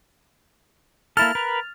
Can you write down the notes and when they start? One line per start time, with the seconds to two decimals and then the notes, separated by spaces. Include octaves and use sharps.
1.17 A#3 E4 A4 F6 A6 F7
1.35 A#4 B4